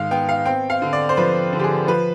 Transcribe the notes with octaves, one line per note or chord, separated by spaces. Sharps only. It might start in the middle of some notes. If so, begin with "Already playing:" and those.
Already playing: G#2 D#3 G#3 F5
B3 G5
F5
C4 G5
F5
D3
D5
C5
F3 B4
D3
G4
G#4
F3 B4